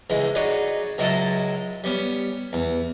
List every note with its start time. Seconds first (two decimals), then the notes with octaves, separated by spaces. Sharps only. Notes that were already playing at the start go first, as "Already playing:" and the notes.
0.10 C#2 E3 G#3
0.35 D#4 F#4 G#4 B4 C#5 D5
0.98 C#2 F#3 G#3 E4 D#5 A5
1.84 G3 B3 C#4
2.53 E2